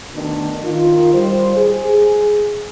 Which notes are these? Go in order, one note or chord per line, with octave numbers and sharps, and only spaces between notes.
D2 B2 D#3 D4
D#3 F4
G3 C5
G#4